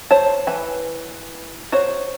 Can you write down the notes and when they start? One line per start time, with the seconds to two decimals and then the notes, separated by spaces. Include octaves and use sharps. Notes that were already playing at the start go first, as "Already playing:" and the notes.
0.11 C5 C#5 A5
0.47 E3 B4 G#5 B5
1.72 F#4 C5 C#5